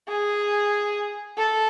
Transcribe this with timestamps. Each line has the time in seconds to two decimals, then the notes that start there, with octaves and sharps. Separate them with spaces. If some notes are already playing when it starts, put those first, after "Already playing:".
0.08 G#4
1.37 A4